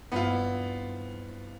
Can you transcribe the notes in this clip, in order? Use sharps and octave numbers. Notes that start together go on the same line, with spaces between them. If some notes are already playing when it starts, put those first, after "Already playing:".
G2 B3 C4 E4 F4